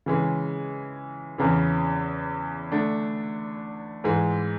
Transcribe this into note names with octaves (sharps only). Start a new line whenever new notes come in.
C#3 E3 G#3
E2 C#3 E3
D3 A3 D4
G#2 E3 G#3